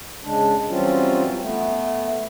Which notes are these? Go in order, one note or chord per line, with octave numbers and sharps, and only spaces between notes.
C#3 G#3 D4
E3 F#3 G3 C4 C#4 F4
A3 B3